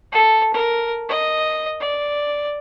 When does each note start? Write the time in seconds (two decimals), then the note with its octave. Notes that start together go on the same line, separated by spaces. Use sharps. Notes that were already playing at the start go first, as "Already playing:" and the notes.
0.12 A4
0.54 A#4
1.09 D#5
1.80 D5